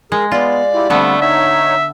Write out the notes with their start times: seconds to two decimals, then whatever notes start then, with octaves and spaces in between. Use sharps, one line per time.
0.12 G#3 G#4 A#4
0.32 B3 F4 D5
0.74 E4 F4 G4
0.90 D3 G3 A3 B3 C4
1.22 D#4 C#5 E5